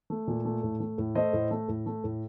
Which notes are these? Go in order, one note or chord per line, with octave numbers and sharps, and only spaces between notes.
A3
A#2
A3
A2
A3
A2
A3 C5 D#5
A2
A3
A2
A3
A2